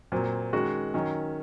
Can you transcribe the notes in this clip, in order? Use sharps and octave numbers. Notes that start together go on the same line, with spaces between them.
A#2 F#3 C4
D#3 G#3 C#4 F#4
D#3 F#3 C#4